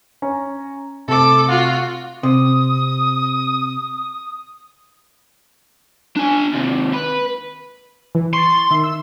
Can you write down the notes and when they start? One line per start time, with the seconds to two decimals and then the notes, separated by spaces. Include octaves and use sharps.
0.22 C#4 A#5
1.08 C3 A3 A4 D6
1.48 F4 F#4
2.23 C3 D#6
6.16 D4 G#5
6.53 D#2 C3
6.93 B4
8.15 E3
8.33 C6 C#6 A6
8.71 D#3 E5
8.84 E6